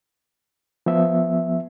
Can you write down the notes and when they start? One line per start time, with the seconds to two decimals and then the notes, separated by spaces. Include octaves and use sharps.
0.86 F3 B3 E5